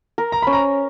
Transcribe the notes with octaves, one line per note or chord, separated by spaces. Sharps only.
A#4
A#5
C#4 B5
A#5